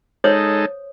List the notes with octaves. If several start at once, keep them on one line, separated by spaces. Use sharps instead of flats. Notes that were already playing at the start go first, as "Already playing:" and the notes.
G#3 D#4 A4 C5 C#5 D#6